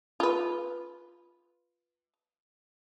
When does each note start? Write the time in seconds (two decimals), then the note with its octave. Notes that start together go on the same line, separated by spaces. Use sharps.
0.20 F4 B4